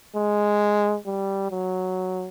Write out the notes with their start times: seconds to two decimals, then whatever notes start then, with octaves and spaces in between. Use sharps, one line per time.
0.16 G#3
1.06 G3
1.51 F#3